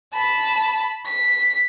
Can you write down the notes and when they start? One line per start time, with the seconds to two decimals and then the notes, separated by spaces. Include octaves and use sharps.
0.13 A5 B5
1.06 B6